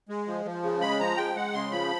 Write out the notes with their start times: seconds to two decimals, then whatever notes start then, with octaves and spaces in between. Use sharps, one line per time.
0.09 G#3
0.27 F3
0.45 F3
0.63 C#3
0.81 G#3 B5
0.99 F3 A#5
1.17 G#3 G5
1.35 G#3 F#5
1.53 C#3 C6
1.71 F3 B5